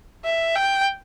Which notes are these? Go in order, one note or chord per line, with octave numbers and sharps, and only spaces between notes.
E5
G5